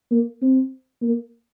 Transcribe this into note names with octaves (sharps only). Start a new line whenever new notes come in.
A#3
C4
A#3